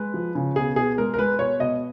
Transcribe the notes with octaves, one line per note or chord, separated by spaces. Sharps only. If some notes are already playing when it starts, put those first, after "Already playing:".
Already playing: G#3 B4
F3
C#3
B2 G#4
B2 G#4
G#3 A#4
A#4
G#3 B4
B2 C#5
B2 D#5